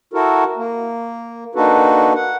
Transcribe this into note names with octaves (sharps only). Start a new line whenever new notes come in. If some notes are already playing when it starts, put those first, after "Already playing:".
E4 F#4 A4 A#4
A#3
A#3 D4 D#4 F#4 A4 B4
F#5